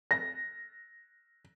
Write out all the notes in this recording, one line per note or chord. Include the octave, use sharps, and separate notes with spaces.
A#6